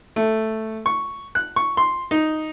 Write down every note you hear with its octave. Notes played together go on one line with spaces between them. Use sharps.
A3
C#6
F#6
C#6
C6
D#4